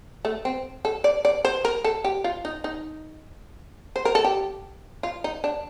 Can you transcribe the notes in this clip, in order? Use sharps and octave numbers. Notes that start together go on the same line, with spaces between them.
A3
C4
A4
D5
D5
C5
A#4
A4
G4
F4
D#4
D#4
C5
A#4
A4
G4
F4
D#4
D4